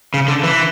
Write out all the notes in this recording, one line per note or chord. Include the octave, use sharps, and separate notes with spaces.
C#3
D3
E3